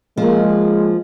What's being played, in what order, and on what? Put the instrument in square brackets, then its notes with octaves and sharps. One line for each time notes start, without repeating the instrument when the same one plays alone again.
[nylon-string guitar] F3 A#3 [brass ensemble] G#3